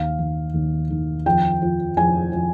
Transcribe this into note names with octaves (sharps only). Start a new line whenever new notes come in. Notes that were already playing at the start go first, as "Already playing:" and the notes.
Already playing: D#2 F5
D#3
D#2
D#3
F2 G5
F3
F2 G#5
F3